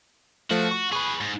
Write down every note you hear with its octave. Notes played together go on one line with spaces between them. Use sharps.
F3 A3 F4 F#4
C#6
G#4 B4 B5 C#6
G#2